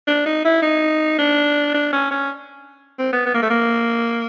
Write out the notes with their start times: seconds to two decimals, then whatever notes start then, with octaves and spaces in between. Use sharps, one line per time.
0.07 D4
0.26 D#4
0.45 E4
0.62 D#4
1.19 D4
1.74 D4
1.92 C#4
2.11 C#4
2.99 C4
3.13 B3
3.26 B3
3.34 A#3
3.42 A3
3.50 A#3